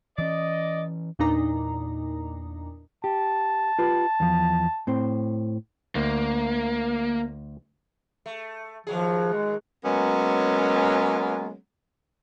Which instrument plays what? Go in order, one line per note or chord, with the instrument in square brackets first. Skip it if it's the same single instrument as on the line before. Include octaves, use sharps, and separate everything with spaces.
[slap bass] E3 C#4 [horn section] D5 D#5
[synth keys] E2 A#2 D4 D#4 A#5
[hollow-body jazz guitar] G4 [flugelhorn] A5
[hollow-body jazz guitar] F4 G4 B4
E2 F3
A2 C4 C5
[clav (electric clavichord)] D2 [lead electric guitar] A#3
[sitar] A3
[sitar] D#2 F#3 G#4 [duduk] F3
[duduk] G#3
[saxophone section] F#3 G#3 A#3 B3 C#4